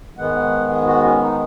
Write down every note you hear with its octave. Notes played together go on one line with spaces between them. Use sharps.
G#2 D#3 G#3 B3 F#5
G#4
F#4
C#4
D#4